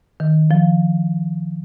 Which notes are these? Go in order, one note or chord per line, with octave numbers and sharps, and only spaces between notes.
D#3
F3